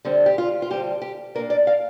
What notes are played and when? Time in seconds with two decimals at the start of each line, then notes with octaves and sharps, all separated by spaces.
0.05 G2 D3 G3 C4
0.26 G4
0.38 F4
0.62 F4
0.70 D3 G3 C4 G4
1.02 G4
1.35 A#2 A#3 D4 A#4
1.50 D5
1.67 F5